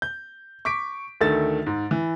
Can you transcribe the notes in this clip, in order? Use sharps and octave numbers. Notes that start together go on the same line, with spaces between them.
G6
C#6 D6 B6 D7
D2 D#3 A3 A4 E6 A6
G#2
E3